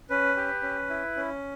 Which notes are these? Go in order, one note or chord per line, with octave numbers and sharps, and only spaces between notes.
C#4 B4
G4
C#4
E4
C#4